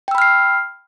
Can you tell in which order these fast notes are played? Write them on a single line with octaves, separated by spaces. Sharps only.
G5 E6 B5 F6 C7